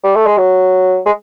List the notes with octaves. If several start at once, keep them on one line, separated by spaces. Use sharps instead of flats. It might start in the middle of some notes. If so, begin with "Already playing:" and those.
G3
A3
G#3
F#3
G#3